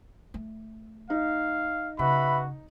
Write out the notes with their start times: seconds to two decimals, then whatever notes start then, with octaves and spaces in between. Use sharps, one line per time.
0.34 A3
1.10 D#4 F5
1.99 C#3 F#4 B4 E5 B5